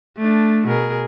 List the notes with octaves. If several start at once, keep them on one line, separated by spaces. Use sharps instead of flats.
A3 D4
B2 G#4 A#4